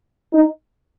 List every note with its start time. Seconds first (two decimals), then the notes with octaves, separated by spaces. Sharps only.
0.33 D#4